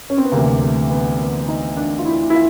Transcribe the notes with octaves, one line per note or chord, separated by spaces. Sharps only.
C#4
C4
B3
D2 C3 E3 A#3
A3
B3
B3
D#4
D4
F4
E4
E4
F4